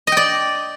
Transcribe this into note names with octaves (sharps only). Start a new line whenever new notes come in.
D5 D#5 G5